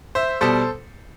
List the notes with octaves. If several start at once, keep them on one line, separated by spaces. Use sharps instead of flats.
C5 E5
B2 G3 A4 C5